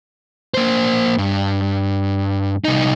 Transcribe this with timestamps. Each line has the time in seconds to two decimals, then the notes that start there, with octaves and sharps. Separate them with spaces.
0.54 A#3 C5
1.18 G2
2.64 C2 D#4